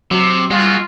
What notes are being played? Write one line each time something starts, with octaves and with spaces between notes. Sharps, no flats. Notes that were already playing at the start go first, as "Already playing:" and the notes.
C3 F#3
G3 G#3 F4 F#4